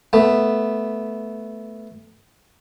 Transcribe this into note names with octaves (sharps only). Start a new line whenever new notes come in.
A3 B3